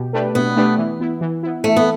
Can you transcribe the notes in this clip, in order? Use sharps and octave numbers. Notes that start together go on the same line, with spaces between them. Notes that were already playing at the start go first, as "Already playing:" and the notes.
Already playing: B2 G4
A3 D4 G4 B4
B2 B3
A3 D4 G4 B4
E3
B3 E4
E3
B3 E4
E3 A3
B3